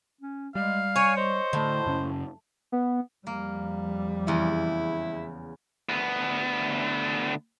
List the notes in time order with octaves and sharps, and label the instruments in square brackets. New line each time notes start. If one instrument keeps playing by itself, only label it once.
[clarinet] C#4
[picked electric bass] G3 [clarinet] G#3 [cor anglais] F5
[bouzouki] C#5 [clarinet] G#5
[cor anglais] C5 [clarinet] D#5
[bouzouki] A2 [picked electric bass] D3 A3
[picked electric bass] F#2 C#3 C#4
[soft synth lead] B3
[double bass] F2 G3 [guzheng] A#3
[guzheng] E2 C#3 [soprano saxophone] E4
[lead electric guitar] D2 B3